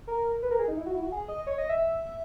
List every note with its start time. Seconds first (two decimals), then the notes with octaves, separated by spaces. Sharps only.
0.07 A#4
0.43 B4
0.51 A#4
0.59 G#4
0.68 D#4
0.77 E4
0.86 F#4
0.95 E4
1.03 F#4
1.12 G#4
1.28 D#5
1.47 C#5
1.58 D#5
1.69 E5